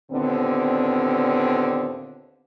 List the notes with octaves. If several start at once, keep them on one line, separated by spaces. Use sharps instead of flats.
D#2 A#2 D3 B3 C4